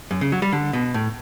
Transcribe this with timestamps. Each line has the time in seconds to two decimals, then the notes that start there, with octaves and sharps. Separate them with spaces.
0.11 F#2
0.21 C#3
0.32 F#3
0.42 G3
0.52 D3
0.73 B2
0.94 A2